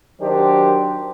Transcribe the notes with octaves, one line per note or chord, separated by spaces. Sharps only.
D#3 F#3 D4 G4 C5